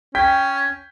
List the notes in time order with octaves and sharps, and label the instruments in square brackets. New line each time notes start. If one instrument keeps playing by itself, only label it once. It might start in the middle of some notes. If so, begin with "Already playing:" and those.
[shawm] C#4 [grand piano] G5 G6 B6